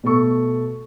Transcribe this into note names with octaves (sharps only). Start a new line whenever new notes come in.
B2 A3 A4 C#6